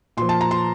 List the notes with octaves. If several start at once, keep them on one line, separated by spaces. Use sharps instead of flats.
A#2 F3 C6
A5
A#5
C6